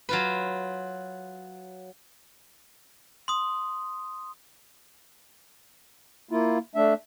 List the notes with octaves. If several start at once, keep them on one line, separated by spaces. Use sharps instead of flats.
F#3 F4 B4
C6 D#6
A#3 E4 F4
A3 D4 E5